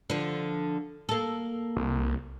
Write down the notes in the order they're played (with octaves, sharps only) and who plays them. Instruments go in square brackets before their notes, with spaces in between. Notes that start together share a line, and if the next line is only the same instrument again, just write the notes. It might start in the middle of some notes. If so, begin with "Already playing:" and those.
[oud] D3 F3
A#3 A4
[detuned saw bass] C2